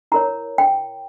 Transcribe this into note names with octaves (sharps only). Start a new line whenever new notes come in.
E4 A#4 C#5 A#5
G5